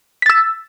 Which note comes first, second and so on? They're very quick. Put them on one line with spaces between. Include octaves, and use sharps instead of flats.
B6 A6 E6